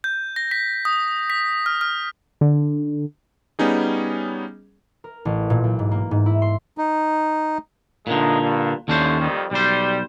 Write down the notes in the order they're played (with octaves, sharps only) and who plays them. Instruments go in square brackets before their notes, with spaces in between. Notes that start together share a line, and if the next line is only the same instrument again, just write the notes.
[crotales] G6
A#6
B6
D#6
B6
F6
F6
[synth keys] D3
[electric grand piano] G3 B3 C#4 D#4 G#4
[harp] A#4
A1
A#2
B1
G#2
A#3
G#2
E4
C6
[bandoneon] D#4
[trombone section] A1 G#3 D#4 [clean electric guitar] A#2 D3
[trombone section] G2
[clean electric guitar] D#2 C#4 C5 [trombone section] A2 D3
[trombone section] F2 D#3 G3
[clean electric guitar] B1 C5 [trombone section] G3